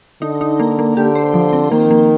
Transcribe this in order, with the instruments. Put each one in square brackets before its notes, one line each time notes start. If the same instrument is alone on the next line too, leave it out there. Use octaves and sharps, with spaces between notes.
[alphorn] D3 [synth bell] D#4
[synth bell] D#4
A#3
A#3
[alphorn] D3 [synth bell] G4
[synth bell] C5
F3
C4
[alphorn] D#3 [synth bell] A#3
[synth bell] A#3